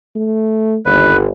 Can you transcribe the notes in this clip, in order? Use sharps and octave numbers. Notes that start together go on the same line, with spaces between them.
A3
G1 D#2 B4